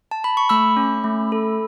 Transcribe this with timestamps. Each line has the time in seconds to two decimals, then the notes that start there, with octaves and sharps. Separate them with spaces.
0.11 A5
0.24 B5
0.37 C#6
0.49 A3 B5 E6
0.77 C#4
1.04 A3
1.32 A4